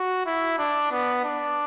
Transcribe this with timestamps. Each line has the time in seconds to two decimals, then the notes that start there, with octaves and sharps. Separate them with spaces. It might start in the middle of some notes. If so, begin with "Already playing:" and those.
Already playing: F#4
0.26 E4
0.59 D4
0.91 B3
1.24 D4